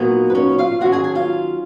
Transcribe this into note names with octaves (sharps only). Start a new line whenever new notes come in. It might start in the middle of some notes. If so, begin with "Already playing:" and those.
Already playing: A#2 F#3 A#3 B3 D#4 A#4
B4
C#4 C#5
F4 F5
D#3 F#3 C#4 F#4 F#5
G#4 G#5
G#4 G#5
F4 F5